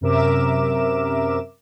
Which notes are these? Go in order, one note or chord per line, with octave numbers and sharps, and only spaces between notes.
F#2 C3 A#4 E5 D6 E7